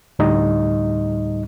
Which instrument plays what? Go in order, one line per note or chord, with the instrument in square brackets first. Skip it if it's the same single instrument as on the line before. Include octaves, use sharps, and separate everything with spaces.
[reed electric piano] D2 A2 G3 D#4 D#5